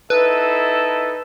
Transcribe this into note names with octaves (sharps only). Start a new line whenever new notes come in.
D#4 E4 A4 B4